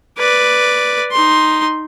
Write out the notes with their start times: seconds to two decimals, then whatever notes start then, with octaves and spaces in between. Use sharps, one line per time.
0.18 B4 D5
1.12 D#4 C6